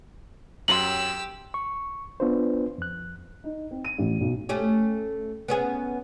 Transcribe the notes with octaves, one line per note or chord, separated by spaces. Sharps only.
F#2 F#3 G4 C6 E6 F#7
C#6
B3 D4 F4 B4 C5
F2 F#6
D#4
C4
D#7
A1
B1
A3 C#4 G4
B3 C#4 G#4